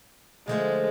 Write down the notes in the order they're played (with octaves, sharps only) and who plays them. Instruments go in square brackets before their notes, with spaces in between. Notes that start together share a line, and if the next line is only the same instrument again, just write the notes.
[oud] D3 F3 A3 [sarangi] G#3